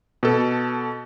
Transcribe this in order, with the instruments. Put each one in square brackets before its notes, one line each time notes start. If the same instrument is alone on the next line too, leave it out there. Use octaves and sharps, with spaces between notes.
[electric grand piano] B2 A4